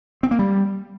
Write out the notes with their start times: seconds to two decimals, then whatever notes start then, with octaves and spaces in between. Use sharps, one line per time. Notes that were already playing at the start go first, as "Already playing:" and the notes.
0.23 C4
0.31 A#3
0.39 G3